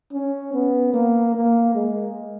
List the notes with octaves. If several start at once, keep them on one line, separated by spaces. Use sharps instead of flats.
C#4
B3
A#3
A#3
G#3